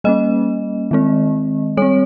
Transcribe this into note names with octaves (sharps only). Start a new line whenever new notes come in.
G3 A#3 C#4 D#5
D#3 G#3 C4
G3 C4 C#5